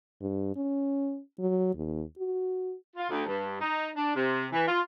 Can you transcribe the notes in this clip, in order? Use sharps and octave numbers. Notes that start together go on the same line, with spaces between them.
G2
C#4
F#3
D#2
F#4
F4
D2
G2
D#4
D4
C3
E3
F4